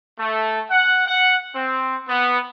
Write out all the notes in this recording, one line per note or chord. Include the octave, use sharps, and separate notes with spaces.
A3
F#5
F#5
C4
B3